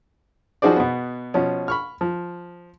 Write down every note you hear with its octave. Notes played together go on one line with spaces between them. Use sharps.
F3 D#4 F#4 G#4 C5 D5
B2 B3
B2 F3 C#4
B5 C#6 F6
F3